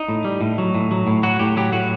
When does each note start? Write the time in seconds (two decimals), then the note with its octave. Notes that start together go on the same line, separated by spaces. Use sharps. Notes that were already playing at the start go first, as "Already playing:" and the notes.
Already playing: D#4
0.08 A2
0.25 G3
0.41 A2
0.58 F#3
0.75 A2
0.91 F#3
1.07 A2
1.23 F#3 F#4
1.40 A2 G4
1.57 F#3 G4
1.72 A2 F#4